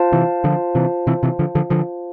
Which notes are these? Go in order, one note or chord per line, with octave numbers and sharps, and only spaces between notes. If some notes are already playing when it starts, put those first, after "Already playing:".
Already playing: F4 C5 F5 A5
C3 E3
D3 F3
C3 E3
C3 E3
C3 E3
D3 F3
D3 F3
D3 F3